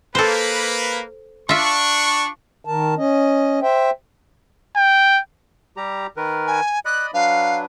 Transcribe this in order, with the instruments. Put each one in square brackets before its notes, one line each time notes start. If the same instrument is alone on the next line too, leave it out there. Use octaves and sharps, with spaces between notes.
[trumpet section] A#3 B4 [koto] A4 C5
[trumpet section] D4 C#6 [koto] F4 E5
[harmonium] D#3 A#4 A5
C#4 D#5
C5 E5 G5
[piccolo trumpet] G5
[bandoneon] G3 G4 A#5
D#3 A#4 B4
[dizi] G#5
[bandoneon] D5 D#5 B5 [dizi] F#6
[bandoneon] F#3 D4 B4 [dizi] F5